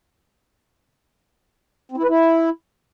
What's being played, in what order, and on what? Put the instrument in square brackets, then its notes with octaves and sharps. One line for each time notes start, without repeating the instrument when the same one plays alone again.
[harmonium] C4
E4
B4
E4